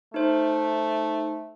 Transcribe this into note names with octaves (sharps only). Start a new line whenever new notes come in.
A3 D#4 C5